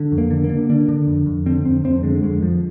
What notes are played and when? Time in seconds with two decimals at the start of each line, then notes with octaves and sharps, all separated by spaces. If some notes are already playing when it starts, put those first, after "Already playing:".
Already playing: D3
0.12 F2
0.18 A#3
0.31 D3
0.44 A#3
0.49 D3
0.70 D3 D4
0.89 D3
1.07 F2
1.26 F2
1.46 D3 C4
1.65 F2 C4
1.84 F2 C4
2.03 D3 G#3
2.22 F2 G#3
2.42 F2 F3